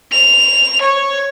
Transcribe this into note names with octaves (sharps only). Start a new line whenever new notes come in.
F7
C#5